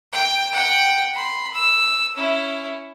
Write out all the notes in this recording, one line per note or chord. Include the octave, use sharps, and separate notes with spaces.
G5
F#5 G5
B5 C6
E6
C#4 E4